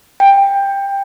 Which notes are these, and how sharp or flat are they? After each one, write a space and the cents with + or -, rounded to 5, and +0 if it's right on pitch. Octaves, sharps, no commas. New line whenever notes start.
G5 +15